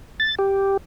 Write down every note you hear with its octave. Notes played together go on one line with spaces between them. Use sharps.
A6
G4